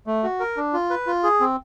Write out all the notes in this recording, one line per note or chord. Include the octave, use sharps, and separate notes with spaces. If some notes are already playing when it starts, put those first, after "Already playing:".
A3
F#4
A#4
D4
F4
B4
F4
G#4
C4